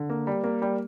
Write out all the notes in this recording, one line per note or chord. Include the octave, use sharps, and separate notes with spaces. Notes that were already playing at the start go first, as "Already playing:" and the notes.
Already playing: D3
A#3
G3
A#3
G3